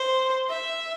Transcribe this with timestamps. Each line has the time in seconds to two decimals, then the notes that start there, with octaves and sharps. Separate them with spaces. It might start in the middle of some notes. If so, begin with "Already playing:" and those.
Already playing: C5
0.50 E5